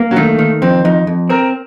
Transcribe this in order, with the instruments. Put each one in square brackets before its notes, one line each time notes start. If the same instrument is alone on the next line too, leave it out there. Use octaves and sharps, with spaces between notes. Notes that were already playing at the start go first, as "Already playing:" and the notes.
Already playing: [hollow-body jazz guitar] A#3
[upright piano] F#3
[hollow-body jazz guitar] D#3 [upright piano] A3
[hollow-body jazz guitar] D#3
[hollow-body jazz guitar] F2 [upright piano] C4
[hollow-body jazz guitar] F2 [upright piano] D#4
[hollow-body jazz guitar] F2
[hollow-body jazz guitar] C4 [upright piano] A#4